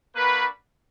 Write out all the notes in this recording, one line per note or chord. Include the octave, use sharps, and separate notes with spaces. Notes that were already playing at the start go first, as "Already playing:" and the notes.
A#3 D4 F#4 B4